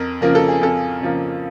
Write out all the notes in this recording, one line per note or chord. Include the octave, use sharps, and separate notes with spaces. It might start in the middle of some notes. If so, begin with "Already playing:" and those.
Already playing: F2 A#4
C#3 F3 A#3 A#4
A4
G#4
F2 A4
C#3 F3 A#3